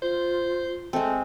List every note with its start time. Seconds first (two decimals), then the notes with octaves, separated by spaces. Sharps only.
0.02 F4 C5
0.93 G#3 A3 C4